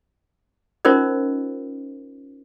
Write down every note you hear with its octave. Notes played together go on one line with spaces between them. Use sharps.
C#4 D#4 F4 A#4 C5 D#5